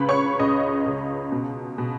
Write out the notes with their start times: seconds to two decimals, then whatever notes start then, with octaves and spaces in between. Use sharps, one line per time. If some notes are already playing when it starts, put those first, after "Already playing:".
Already playing: C#2 C#3 B4 B5
0.09 C#5 C#6
0.39 C#2 D#5 D#6
0.86 C#2
1.32 B2
1.78 B2